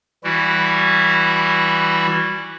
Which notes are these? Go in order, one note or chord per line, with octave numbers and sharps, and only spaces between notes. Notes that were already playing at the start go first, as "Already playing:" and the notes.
E3 G3 E4 F#4